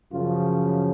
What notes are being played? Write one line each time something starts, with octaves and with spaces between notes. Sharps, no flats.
F#2 C#3 F3 F4